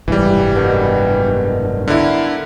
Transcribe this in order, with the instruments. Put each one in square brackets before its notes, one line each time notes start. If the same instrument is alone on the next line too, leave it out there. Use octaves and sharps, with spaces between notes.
[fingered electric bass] F#1 C2 G#2 [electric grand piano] E3 G3
[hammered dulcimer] B2 D3 D#3
[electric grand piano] D3 E4 [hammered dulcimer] A#4 F5